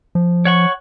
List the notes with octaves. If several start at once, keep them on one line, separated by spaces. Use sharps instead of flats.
F3
C#5 F#5 C#6